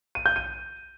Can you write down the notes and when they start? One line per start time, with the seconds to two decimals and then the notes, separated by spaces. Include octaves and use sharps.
0.15 D#7
0.26 G6
0.36 D#7